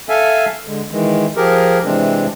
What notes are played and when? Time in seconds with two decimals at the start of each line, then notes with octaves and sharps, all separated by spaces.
0.09 A4 E5 F5 G#5
0.67 D3 G#3
0.91 D#3 E3 G#3
1.36 F3 G4 G#4 A#4
1.84 C3 E3 G#3 C4 D4